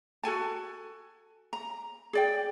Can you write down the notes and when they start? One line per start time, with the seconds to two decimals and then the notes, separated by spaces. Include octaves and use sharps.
0.23 F#4 A4 G#5 A5
1.53 A#5
2.13 G#4 D5 G5